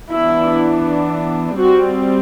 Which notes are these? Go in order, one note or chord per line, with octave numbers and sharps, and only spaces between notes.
E3 B3 D4 E4
G3 C4 F#4